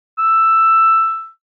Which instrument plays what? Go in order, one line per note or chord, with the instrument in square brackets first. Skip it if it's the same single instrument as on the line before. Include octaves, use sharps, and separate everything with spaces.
[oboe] E6